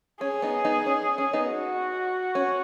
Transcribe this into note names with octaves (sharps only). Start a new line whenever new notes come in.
C#4 G#4
B3 D#4
B3 D#4
C#4
C#4
B3 D#4
F#4
C#4